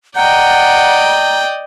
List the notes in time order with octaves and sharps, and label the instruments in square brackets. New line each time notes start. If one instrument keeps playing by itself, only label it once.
[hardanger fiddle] D5 D#5 [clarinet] F#5 [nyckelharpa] G5 [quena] A#5